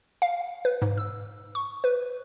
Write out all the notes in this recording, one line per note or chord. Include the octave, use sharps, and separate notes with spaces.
F5
B4
G#2
E6
C#6
B4